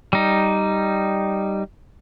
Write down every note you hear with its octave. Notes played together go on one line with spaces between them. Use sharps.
G3 D#4